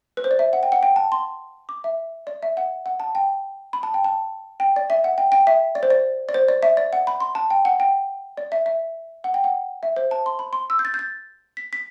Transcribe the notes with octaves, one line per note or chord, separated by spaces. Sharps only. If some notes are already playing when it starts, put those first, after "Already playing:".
B4
C5
D5
E5
F#5
G5
F#5
G5
A5
C6
D6
E5
D5
E5
F#5
F#5
A5
G5
B5
A5
G5
A5
G5
D5
E5
F#5
G5
G5
E5
D5
C5
D5
D5
C5
D5
E5
D5
F#5
B5
C6
A5
G5
F#5
G5
D5
E5
E5
F#5
G5
F#5
E5
C5
A5
C6
B5
C6
E6
G6
A6
G6
A6
B6
B6